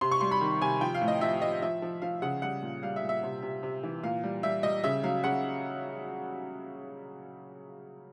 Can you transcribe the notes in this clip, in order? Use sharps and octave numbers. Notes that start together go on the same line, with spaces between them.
C3 C6
C#6
G3 C6
B5
D#3
C3 G#5
F3 G5
F5
A2
D#5
F3 E5
F3 D#5
F3 E5
F3
F3 F5
C#3 F#5
G3 F#5
A#2
G3 F5
E5
A#2
E5
C3
C3
C3
E3
A#2 F5
G3
G3 E5
G3 D#5
C#3 E5
F#3 F5
C#3 F#5